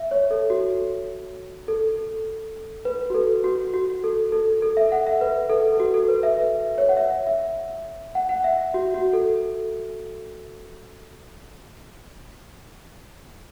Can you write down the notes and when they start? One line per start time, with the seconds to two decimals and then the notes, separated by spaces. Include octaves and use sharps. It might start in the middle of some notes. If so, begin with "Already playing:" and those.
Already playing: E5
0.11 C#5
0.31 A4
0.50 F#4
1.68 A4
2.85 B4
3.10 F#4
3.14 A4
3.44 F#4
3.74 F#4
4.04 A4
4.32 A4
4.62 A4
4.77 E5
4.92 F#5
5.07 E5
5.21 B4
5.50 A4
5.72 A4
5.80 F#4
5.94 A4
6.08 B4
6.23 E5
6.39 E5
6.78 C#5
6.89 F#5
6.97 E5
7.27 E5
8.15 F#5
8.29 F#5
8.44 E5
8.74 F#4
8.94 F#4
9.13 A4